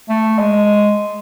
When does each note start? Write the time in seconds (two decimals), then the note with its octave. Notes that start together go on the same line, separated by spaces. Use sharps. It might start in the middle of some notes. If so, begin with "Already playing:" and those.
0.09 A3
0.39 G#3